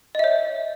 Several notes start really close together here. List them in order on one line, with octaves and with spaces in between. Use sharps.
D#5 E5 C#5